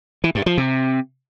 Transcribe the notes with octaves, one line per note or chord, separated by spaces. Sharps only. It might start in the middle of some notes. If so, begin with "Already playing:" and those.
E3
G2
F3
C3